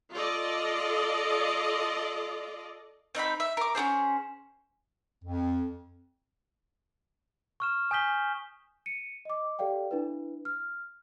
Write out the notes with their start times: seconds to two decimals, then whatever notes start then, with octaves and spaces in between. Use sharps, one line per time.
0.11 F4 A4 D5 D#5
3.15 C4 D#4 F#5 B5
3.40 E5
3.57 A#4 D6
3.75 C#4 D4 G#4 C5
5.24 F2
7.60 C#6 F6 E7
7.91 G#5 D#6 G6 B6 G7
8.86 C#7 D#7
9.25 D#5 D6
9.59 G4 A4 D5 F5 G5
9.91 D4 E4 B4
10.45 F6